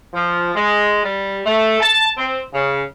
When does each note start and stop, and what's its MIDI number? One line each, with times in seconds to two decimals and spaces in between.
0.14 0.52 53
0.55 1.00 56
1.03 1.40 55
1.46 1.80 57
1.80 2.07 81
2.17 2.39 60
2.53 2.82 49